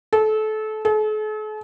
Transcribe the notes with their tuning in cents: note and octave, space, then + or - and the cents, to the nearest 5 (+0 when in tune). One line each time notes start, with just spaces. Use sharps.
A4 -25
A4 -45